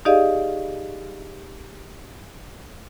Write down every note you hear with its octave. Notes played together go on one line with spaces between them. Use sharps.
D#4 G4 G#4 D5 D#5 F5